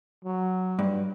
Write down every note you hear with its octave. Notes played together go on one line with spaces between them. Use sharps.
F#3
G2